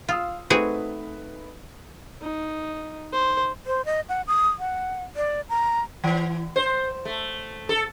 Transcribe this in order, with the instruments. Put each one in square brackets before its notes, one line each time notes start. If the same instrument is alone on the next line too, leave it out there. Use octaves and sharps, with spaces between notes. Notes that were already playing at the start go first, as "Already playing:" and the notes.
[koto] F4 [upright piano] F5 D#6 E6
[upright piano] A3 D#4 B4 [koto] C4 F#4 G#4
[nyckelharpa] D#4
C5
[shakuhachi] C5
D#5
F#5
D#6
F#5
D5
A#5
[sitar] E3
C5
A3
A4